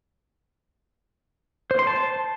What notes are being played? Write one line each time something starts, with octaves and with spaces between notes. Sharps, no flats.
C5
C6
A5